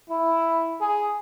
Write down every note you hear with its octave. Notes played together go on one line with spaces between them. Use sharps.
E4
G#4